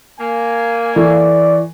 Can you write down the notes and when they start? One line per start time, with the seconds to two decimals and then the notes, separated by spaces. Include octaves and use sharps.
0.19 A#3 G#5
0.96 E3 A4 D5 C#6